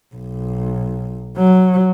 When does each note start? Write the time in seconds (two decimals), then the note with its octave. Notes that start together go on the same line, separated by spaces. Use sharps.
0.15 B1
1.37 F#3